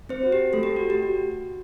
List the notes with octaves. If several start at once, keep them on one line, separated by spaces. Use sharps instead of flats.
C4 C5
F#4
G4
A3 A4
G4
F#4
G4
F#4